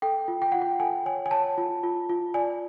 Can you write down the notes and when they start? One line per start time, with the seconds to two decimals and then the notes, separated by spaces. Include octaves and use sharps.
0.02 A4 G5
0.28 F4
0.42 G5
0.52 F4 F#5
0.62 G5
0.80 A4 G#5
1.06 C#5 G#5
1.26 G#5
1.31 C#5 A5
1.58 F4
1.83 F4
2.09 F4
2.34 D5 G#5